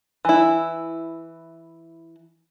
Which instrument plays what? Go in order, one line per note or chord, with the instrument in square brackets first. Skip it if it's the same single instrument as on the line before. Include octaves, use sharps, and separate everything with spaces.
[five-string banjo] E3 E4